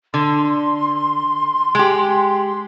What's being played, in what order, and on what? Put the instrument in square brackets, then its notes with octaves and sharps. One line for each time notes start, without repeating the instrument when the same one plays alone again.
[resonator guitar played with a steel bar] D3 [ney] C6
[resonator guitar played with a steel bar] G#3 G4